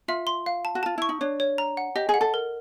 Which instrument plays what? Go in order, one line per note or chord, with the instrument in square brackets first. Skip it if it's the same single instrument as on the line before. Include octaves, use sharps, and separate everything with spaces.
[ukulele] F4 [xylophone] E5
[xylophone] C6
F5
A5
[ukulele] F#4
[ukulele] F4 [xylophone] A5
[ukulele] E4 [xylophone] C#6
[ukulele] D#4
[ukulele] D4 [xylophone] C#5
[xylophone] C#5
A#5
F#5
[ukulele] G4 [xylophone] D#5
[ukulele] G#4
[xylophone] F#5
[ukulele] A4
[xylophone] A#4